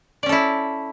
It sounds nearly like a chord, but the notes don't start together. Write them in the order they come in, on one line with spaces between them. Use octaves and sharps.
D5 C#4 A4 E4